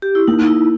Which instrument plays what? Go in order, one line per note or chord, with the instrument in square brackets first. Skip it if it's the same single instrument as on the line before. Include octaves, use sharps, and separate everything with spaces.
[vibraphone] G4
E4
[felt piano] A#3 [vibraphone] D#4
[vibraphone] D#4
E4